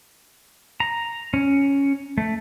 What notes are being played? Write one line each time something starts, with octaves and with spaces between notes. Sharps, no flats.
A#5
C#4
A3